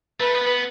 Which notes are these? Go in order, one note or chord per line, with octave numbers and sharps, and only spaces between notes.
A3 B4
B3
B3